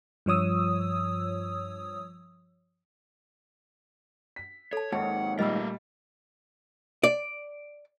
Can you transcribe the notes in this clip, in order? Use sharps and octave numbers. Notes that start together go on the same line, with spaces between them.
G2 F3 C#5 D#6 E6
B6
A4 C#5 A5
D#2 G#2 C#5 F#5 A5
A#2 G3 A3 A#4 D#5 E6
D5